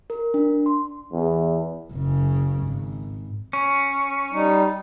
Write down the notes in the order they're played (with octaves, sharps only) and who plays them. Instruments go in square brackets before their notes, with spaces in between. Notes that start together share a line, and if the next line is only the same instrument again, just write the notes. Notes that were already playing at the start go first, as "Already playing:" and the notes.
[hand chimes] A#4
D4
C6
[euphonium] E2
[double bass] F#1 C#3
G#1
[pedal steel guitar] C#4
[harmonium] G3 D#4